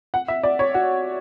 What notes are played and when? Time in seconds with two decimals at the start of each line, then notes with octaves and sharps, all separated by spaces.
0.14 F#5
0.28 E5
0.43 D5
0.59 C#5
0.74 F#4